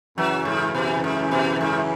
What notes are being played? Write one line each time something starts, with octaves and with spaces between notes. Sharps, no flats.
F#2 C#3 E3 F#3
G#2
B2
G#2
B2
G#2